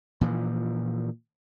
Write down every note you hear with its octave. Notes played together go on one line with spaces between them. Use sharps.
A#2 E3 F3